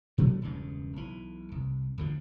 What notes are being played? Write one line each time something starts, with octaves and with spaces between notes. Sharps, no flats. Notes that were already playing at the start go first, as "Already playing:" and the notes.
B2 F#3 A3 B3
E1 G2 C#3
B1 E3
C2
D2 D3 F3